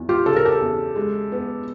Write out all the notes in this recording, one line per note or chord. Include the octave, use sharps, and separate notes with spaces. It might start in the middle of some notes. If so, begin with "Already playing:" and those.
Already playing: E2 F#3
F4 G4
C#3 A4
A#4
G4 A4
E2
G#3
B3